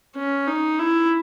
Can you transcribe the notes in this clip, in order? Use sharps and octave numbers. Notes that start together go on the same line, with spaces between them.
C#4
D#4
E4